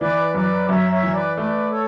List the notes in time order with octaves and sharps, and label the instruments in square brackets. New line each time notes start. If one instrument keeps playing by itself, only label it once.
[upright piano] E3 [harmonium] B4 D5
[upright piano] F#2 [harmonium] B4 D5
[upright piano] F#2 [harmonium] C#5 E5
[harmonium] C#5 E5
[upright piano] E3
[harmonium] B4 D5
[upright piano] A3 [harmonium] B4 D5
[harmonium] A4 C#5